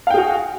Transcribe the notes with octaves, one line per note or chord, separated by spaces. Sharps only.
F#4 G#4 F5 G5